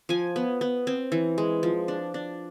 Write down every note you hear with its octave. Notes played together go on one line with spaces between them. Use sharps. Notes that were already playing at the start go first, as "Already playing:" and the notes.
F3 G#5
B3
B3
C4
E3
G#3
F3
D4
D4